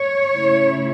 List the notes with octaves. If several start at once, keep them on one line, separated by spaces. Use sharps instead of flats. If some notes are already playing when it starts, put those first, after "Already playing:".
Already playing: C#5
C#3 A3 E4